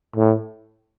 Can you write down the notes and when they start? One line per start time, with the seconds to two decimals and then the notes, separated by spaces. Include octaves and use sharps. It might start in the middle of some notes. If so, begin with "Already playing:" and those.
0.16 A2